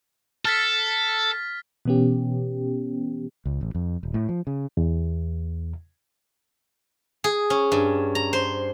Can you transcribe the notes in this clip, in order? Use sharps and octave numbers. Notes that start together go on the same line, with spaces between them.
A4 F6 A6 B6
B2 E3 B3 C#4 G4
C#2
A1
F2
D#1
A2
F3
C#3
E2
G#4
C#4
G2
A#5
C5